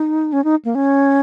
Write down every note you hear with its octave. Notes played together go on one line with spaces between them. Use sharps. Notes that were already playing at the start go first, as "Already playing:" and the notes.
Already playing: D#4
C#4
D#4
A#3
C#4